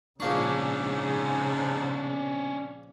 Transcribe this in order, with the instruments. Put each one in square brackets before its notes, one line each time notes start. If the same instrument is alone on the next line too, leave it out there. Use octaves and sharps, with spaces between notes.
[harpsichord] A#1 A#3 C#6 [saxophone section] G#2 [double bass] C#3 [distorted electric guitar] C#4 D4